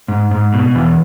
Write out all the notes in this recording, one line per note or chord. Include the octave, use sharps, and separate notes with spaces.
G#2
G#2
B2
E2